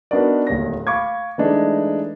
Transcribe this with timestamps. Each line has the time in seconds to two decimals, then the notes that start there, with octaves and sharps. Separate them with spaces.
0.11 B3 D4 D#4 F#4 A#4 D5
0.47 D1 D#2 C#5 A#6
0.87 F5 B5 C#6 D6 G#6
1.38 E3 G#3 A3 D4 D#4